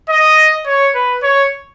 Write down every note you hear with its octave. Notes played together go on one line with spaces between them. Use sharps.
D#5
C#5
B4
C#5